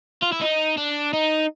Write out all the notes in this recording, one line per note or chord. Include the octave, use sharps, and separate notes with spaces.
F4
E4
D#4
D4
D#4